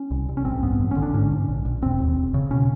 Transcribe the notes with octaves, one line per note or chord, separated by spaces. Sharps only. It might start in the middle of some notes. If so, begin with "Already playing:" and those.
Already playing: C#4
C2
C2
C#4
A1 C4
G2 B3
A1
C#4
D3
D4
G#2 C#4
G#2
A#1
A#1
E1 C4
D#2
E1
C#3
B2 C#4